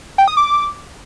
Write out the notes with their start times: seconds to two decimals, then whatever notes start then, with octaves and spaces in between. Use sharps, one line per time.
0.18 G5
0.28 D#6
0.37 D6